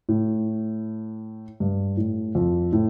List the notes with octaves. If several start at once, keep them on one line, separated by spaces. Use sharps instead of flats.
A2
G2
A2
F2
A2